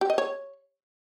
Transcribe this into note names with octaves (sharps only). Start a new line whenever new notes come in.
G4
D#5
C#5